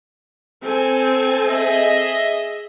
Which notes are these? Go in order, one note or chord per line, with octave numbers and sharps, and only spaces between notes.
C4 A4 G#5
G#4 D#5 E5